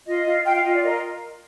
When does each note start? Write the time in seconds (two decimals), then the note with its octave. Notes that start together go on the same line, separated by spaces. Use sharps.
0.07 F4 D#5
0.25 F4
0.44 F4 G5
0.55 F5
0.64 F4 D#5
0.74 D5
0.83 A#4 D#5